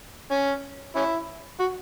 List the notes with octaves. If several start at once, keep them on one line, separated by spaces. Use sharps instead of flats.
C#4
C#4 E4
F#4